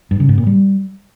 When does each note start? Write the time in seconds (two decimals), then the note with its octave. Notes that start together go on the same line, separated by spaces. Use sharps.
0.11 G2
0.20 C#3
0.29 G#2
0.38 A#2
0.47 G3